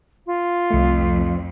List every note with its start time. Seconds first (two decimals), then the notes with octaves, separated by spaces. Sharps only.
0.26 F4
0.70 C2 F2 A3